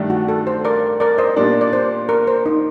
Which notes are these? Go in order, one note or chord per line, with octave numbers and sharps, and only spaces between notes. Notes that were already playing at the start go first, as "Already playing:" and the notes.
Already playing: G2 D#3 A3 D4
F#4
A4
C5
A#4 D5
A#4 D5
C5 D#5
A#2 G3 D4 A#4 D5
D5
C5
A#4
C5
D#4